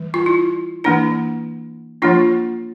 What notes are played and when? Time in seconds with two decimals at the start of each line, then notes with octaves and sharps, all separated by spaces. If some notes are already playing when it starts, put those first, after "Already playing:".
Already playing: E3 G3
0.14 F4
0.26 E4
0.84 E3 A#3 D4 E4
2.02 F3 A#3 D4 F4